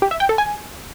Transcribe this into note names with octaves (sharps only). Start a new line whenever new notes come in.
G4
E5
G5
A4
G#5